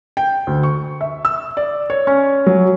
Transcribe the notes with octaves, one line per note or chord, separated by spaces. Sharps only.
G5
D2
C#6
E5
E6
D5
C#5
C#4
F#3